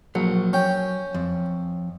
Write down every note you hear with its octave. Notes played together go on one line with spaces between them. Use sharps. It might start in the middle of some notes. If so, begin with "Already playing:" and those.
A#1 F#3
C#4 G5
F2